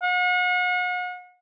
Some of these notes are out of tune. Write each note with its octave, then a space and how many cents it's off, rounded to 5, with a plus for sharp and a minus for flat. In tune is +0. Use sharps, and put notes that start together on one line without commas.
F#5 -40